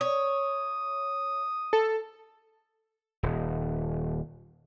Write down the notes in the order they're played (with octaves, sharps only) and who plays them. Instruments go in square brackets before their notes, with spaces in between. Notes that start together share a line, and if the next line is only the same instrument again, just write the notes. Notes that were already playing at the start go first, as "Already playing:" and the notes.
[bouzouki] C#5 [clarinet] D#6
[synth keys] A4
[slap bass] D#1